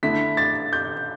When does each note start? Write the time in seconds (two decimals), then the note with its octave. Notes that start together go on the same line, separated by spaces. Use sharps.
0.03 D3 A3 E4 B6
0.37 A6
0.73 G6